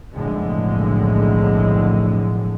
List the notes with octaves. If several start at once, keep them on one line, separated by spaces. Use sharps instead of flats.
F#1 B1 F2 A2 D3 G#3